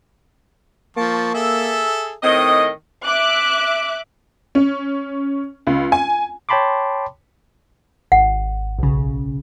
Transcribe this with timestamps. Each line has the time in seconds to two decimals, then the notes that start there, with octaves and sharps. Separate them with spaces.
0.97 F3 A#3 A5 C#6
1.34 G#4 A4 E5
2.23 A2 D#3 C4 D#5 D#6
3.04 E5 D6 F#6
4.55 C#4
5.67 C#2
5.92 G#5
6.49 C#5 G5 A5 B5 C6 D6
8.12 G#1 F#5
8.79 B1 C#3